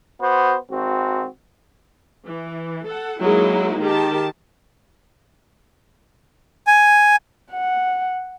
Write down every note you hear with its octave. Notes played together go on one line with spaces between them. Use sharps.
B3 F#4 C5
G#1 C4 F#4
E3
A4 F#5
F#3 G#3 A#3 D#4 E4
D#3 G4 A5
G#5
F#5